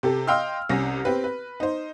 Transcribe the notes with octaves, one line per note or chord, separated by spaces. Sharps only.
C3 G4 A4
D#5 F5 G5 C6 E6 F6
C2 C3 C#4 A#6
C4 G4 B4
B4
D#4 C5